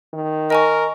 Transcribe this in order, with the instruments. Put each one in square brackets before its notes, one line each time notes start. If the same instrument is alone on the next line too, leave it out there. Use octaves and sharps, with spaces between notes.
[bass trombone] D#3
[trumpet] A#4 [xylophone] D#5 G#5 C#6